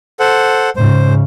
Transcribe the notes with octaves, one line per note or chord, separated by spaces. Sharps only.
A4 C5 F#5
G#2 C#3 C5